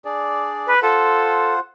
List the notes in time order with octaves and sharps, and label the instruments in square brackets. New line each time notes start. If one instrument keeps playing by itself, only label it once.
[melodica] D4 G#4 D5
[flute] B4
[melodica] F4 C5 F#5 [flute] A4